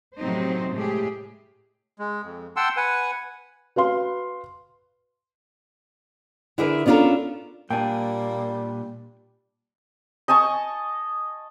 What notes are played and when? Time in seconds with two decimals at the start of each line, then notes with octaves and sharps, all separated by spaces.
0.16 A2 C3 F#3 C4 D#4 C5
0.71 A2 G#3 A3 G4 G#4
1.99 G#3
2.24 F2
2.56 F#5 G5 A5 C6 E6
2.77 B4 F#5 G#5
3.76 F#4 B4 F5 C6
6.58 D3 E4 G#4 A#4 B4 E5
6.86 B3 C#4 D4 F4 A4 A#4
7.70 A#2 G3 A#3 D4 G5 G#5
10.28 D#5 G#5 A5 C#6